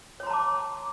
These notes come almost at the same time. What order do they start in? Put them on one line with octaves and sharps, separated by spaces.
C#5 C6 A#5 A5 D6